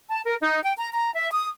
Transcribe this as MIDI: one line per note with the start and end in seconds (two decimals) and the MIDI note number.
0.09 0.19 81
0.26 0.35 70
0.41 0.61 63
0.62 0.72 79
0.77 0.88 82
0.92 1.10 82
1.14 1.30 76
1.31 1.47 87